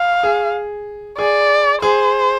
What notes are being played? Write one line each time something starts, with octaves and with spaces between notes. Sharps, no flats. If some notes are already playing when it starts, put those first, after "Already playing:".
Already playing: F5
G#4
G#4 D5
G#4 C5